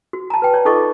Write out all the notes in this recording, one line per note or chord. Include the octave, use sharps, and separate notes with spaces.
F#4
A5 A#5
B4 G5
C#5 D5 G5
D#4 F4 A4 D#5 C#6 D6